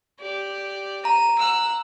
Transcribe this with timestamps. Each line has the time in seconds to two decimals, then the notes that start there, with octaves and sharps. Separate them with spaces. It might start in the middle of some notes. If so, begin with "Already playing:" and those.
0.20 G4 D5
1.05 A#5 D#7
1.38 F#5 E6